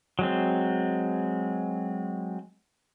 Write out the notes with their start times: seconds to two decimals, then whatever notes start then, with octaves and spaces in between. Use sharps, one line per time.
0.19 F#3 G#3 C4